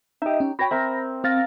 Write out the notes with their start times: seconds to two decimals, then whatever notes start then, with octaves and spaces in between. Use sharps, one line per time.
0.22 D#4 G4 D#5 E5
0.40 C#4
0.59 F#4 C#5 G5 B5 A#6
0.71 C4 A#4 E5
1.24 C4 F5 A6 A#6